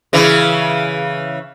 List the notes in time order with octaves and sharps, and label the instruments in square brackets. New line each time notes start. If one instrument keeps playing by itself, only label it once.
[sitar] C#3 E3 E4